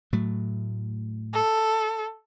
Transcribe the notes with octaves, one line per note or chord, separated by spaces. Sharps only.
A2 F#3 A3
A4